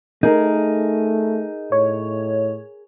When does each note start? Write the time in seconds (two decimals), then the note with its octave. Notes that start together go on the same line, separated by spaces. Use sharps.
0.23 A3 D#4 G#4 A#4
1.72 A2 C#5